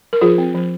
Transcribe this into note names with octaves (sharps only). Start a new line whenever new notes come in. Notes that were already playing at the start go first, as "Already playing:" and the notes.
A#4
F3 F4 G#4
C4
F3